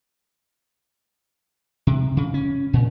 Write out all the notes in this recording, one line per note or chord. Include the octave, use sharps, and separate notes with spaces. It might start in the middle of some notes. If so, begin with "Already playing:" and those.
C3
C#3
C#4
A#2